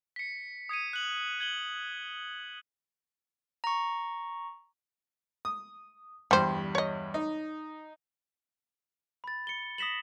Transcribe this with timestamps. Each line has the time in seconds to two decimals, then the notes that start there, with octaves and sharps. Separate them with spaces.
0.16 B6 C#7
0.69 D#6 G#6 C#7 D#7
0.93 F#6 F#7
1.40 G#6 F#7 G7
3.64 A#5 C#6
5.45 D#6
6.31 E2 G2 G3 C5
6.75 C#5 D#5
7.14 D#4
9.24 B5 A6
9.47 C#7 G7
9.78 D#6 A#6 B6 E7 F#7